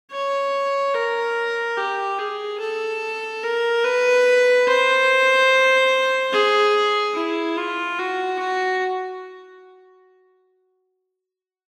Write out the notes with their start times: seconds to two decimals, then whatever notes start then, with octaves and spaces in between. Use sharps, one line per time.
0.12 C#5
0.95 A#4
1.77 G4
2.19 G#4
2.59 A4
3.43 A#4
3.84 B4
4.67 C5
6.33 G#4
7.14 E4
7.57 F4
7.98 F#4
8.39 F#4